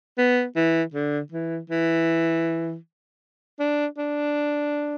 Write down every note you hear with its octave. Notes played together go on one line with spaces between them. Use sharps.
B3
E3
D3
E3
E3
D4
D4